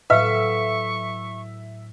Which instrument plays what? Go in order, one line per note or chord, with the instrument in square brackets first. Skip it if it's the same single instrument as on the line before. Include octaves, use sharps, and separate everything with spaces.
[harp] A2 F#3 [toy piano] B4 F5 [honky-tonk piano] E5 [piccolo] C#6